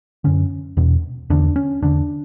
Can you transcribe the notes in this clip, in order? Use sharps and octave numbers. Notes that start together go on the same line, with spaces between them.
F#2 D3 C#4
E2 B2
E2 D3 D4
C#4
E2 D3 D4